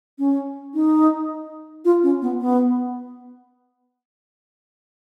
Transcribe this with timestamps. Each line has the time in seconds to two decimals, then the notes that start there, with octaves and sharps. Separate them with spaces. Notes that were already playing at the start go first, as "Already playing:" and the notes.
0.19 C#4
0.74 D#4
1.85 F4
2.03 C#4
2.22 B3
2.40 B3